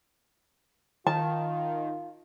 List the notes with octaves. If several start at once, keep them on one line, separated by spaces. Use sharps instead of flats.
D#3 F4 A5